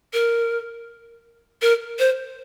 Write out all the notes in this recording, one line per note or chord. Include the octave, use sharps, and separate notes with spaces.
A#4
A#4
C5